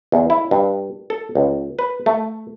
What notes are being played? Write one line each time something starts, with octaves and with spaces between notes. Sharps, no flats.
E2
E4
G2
A4
C#2
B4
A3